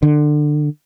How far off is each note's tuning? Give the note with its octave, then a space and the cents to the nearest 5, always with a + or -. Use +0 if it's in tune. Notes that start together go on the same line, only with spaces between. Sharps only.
D3 +25